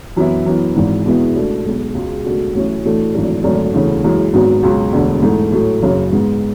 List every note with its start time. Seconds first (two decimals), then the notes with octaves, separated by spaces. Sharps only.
0.16 F#2 E3 B3 E4
0.46 F#2 E3 B3
0.75 G#1 G#2 E3
1.05 E2 B2 G#3 B3 E4
1.35 C#2 B2 A3 D4
1.66 B1 B2 G#3
1.95 C#2 B2 G#3
2.24 C#2 B2 A3 D4 F#4
2.54 A1 A2 F#3 C#4 E4
2.85 A2 E3 A3 D4 F#4
3.14 G#1 F#2 E3 A3 D4
3.44 G#1 F#2 D3 A3 D4
3.73 E1 D2 C#3 E3
4.04 F#1 F#2 E3 G#3
4.33 G#1 G#2 F#3 B3 F#4
4.63 C#2 B2 F#3
4.93 E1 D2 D3
5.22 G#2 E3 A3
5.52 A2 F#3 A3
5.83 F#1 F#2 C#3
6.12 G#2 G#3 B3